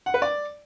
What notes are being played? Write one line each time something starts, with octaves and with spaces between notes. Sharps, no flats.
F#5
B4
D5